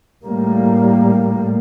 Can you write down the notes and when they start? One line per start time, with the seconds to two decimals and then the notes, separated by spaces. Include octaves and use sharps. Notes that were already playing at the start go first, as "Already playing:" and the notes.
0.24 A2 G3 A#3